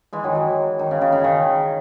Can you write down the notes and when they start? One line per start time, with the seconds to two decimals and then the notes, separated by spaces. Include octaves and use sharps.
0.13 E3 G#3
0.24 D#3 F#3
0.35 E3
0.79 D#3
0.91 C#3
1.01 C#3
1.12 C#3
1.24 D#3